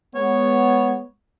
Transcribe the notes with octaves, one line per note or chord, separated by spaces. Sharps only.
G#3 B3 C#5